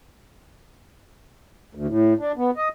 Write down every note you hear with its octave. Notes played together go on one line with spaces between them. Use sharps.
D2
A2
D4
B3
D#5